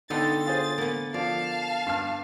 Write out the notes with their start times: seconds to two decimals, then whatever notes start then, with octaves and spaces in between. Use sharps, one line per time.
0.10 D3 B3 D#4 A4 G5 C6 A6
0.46 F4 G#4 C5
0.78 A#3 B3
1.14 F3 D5 F5 A5
1.86 G2 F6